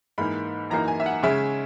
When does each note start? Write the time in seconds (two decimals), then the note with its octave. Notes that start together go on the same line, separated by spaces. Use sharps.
0.18 G#2 E3 A#3 D#4 B5
0.70 F#2 E3 A#3 D#4 A#5
0.88 G#5
1.00 E5
1.06 F#5
1.23 C#3 G#3 C#4 E5